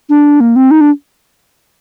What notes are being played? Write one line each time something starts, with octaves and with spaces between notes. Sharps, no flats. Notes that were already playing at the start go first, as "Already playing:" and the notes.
D4
A#3
C4
D#4
D4